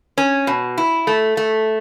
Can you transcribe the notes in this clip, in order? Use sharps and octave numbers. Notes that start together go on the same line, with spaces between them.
C#4
B2
E4
A3
A3